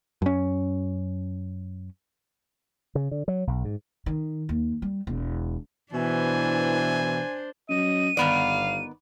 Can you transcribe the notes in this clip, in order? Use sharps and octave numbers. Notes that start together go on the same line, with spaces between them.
F#2 C#4
C#3
D3
F#3
B1
G#2
D#3
D#2
G3
E1
B2 E3 D4 C5 G#5
F#3 C#4 D#5 D#7
G1 D#3 B3 D5 F5